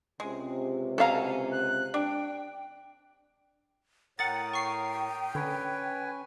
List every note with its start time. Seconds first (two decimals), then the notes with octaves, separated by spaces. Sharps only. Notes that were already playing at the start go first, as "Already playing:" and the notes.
0.20 C#2 C3 G#3
0.98 B2 F#3 A4 F5 G#5 A#5
1.51 F#6
1.94 D4 G5
4.19 A2 A#4 C#5 F#5 G5 D#6 A6
4.53 C#6 C7
5.35 D3 C#4 B4 C#5 G#5